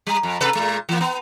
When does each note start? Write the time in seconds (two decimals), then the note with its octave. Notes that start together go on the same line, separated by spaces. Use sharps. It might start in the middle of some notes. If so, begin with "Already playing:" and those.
0.07 G3
0.23 F2
0.41 C3 A4 B4
0.55 A#2 G#3
0.89 E3 A#3
1.01 B3